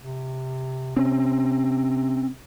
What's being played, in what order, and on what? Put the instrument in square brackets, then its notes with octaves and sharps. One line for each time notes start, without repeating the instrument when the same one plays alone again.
[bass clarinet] C3
[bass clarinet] C3 [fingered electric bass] C4 C#4